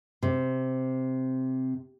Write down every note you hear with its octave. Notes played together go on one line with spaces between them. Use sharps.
C3